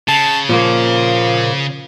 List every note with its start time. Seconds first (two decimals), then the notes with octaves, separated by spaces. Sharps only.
0.08 C#3 A5
0.49 A#2 F3 A#3